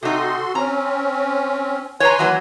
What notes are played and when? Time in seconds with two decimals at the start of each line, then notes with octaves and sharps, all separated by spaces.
0.03 C3 D#4 F#4 A4 C6
0.55 C4 C#4 A#5
2.00 B4 C#5 G#5 A#5 C6
2.19 E3 F#3 A#3